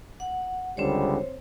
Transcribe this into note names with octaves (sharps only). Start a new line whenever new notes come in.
F#5
C#2 D3 G3 C4 C5 C#5